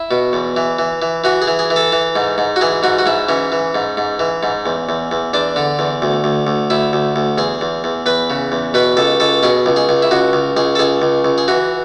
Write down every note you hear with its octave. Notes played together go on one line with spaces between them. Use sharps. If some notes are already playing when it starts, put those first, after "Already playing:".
Already playing: E4
B2
E2
E3
E3
E3
E3 F#4
G#4
E3
G#4
E3
A4
E3
G#2
G#2
F#4
E3 G#4
G#2 F#4
F#4
G#2 E4
E3 C#4
E3
G#2
G#2
E3
G#2
E2
E2
E2
E2 D4
D3
E2
D2
D2
D2
D2 E4
D2
D2
E2 G#4
E2
E2
E2 B4
C#3
E2
B2 B4
C#2 A4
C#2 A4
B2 G#4
C#2
G#4
C#2
E4
C#2 F#4
C#2
C#2 G#4
A4
C#2 G#4
C#2
C#2
G#4
E3 F#4